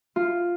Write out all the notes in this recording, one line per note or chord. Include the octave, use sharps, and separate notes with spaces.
F4